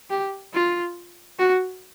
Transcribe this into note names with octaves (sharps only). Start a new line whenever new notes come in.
G4
F4
F#4